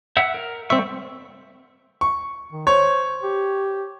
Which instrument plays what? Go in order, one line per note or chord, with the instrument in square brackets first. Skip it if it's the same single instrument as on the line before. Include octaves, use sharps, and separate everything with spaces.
[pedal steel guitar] E5 F#5 E6
A#4
[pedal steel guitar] G3 C#6 [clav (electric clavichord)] C4 E5
[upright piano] C#6
[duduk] D#3
[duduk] C5 [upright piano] C#5
[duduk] G4